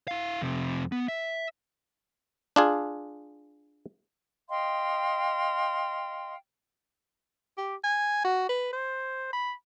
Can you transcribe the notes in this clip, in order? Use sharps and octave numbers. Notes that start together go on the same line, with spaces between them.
E4 F5
F2 C3
B3
E5
D4 F4 G#4
D#5 F5 G5 C6
G4
G#5
F#4
B4
C5
B5